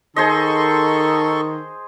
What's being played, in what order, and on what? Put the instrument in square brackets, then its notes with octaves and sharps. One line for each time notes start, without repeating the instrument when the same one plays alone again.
[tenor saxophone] D#3 [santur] G#4 C5 D#5 [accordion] A4 C6 C#6